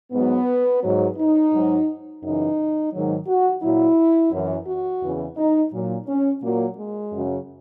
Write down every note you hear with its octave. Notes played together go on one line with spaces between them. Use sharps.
G#2 F#3 B3
G#2 F#3
D#4
G#2 F#3
F#2 C#3 E3 D#4
G#2 D#3 F#3
F#4
A#2 F#3 E4
F#2 E3
F#4
E2 C#3 E3
D#4
A#2 F#3
C#4
A#2 F#3 A#3
G#3
F#2 C#3 F#3